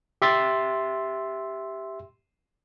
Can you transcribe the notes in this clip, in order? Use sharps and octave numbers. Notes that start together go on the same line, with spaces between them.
G4 E5 C6 A6